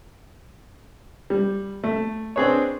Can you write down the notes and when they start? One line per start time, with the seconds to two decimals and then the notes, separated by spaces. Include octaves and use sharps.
1.30 G3
1.84 A3
2.36 C4 D4 G#4 B4 C#5